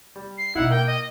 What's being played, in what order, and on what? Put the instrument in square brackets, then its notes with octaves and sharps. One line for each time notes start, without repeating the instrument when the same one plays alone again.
[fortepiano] G3
[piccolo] C7
[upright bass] B2 G#3 [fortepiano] D#4 E4 [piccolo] F#5
[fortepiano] A#3 [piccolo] G5
[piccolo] D#5